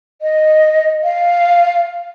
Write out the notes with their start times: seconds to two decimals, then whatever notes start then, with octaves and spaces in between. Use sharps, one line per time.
0.22 D#5
1.03 F5